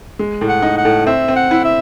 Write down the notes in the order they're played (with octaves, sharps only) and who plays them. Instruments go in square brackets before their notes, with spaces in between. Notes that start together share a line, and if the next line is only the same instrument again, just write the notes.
[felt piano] G#3
A2
[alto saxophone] F#5
[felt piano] D#4
[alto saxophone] F#5
[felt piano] A2
[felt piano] C4 [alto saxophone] E5
[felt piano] C4
[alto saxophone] F#5
[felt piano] E4
[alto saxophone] E5